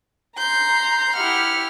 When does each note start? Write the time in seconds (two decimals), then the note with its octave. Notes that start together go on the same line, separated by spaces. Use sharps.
0.37 A#5 C6 G6
1.16 E4 G4 F#5 F6